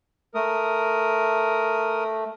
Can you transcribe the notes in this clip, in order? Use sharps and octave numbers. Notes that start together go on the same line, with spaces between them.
A3 A#4 D#6